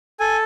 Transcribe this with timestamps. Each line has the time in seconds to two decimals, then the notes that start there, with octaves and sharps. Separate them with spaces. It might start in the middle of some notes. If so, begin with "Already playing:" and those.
0.20 A4 G#5